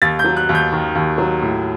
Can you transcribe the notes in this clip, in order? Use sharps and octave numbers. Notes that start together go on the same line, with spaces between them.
D#2 A6
G6
F#3
F#6
D#2
G6
D#3
D#2
F#3
A2